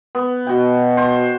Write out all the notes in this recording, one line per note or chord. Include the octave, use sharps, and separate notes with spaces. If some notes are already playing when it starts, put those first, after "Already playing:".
B3
B2 F#4 G5
C5